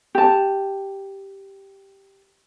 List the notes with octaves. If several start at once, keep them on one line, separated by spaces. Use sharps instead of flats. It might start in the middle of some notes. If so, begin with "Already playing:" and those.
G4 A5